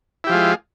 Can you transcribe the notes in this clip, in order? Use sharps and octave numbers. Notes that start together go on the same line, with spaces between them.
F3 G#3 E4 F4 G4